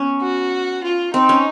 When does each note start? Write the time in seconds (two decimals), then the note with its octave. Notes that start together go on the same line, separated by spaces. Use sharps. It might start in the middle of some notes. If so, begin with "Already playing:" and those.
Already playing: B3 C#4
0.22 F#4
0.83 F4
1.14 C4 D#4
1.29 C#4